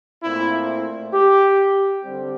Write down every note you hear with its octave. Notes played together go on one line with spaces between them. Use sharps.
A#2 A3 C4 E4
G4
D3 G3 C4